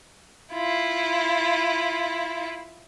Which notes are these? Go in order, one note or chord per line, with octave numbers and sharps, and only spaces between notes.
E4 F4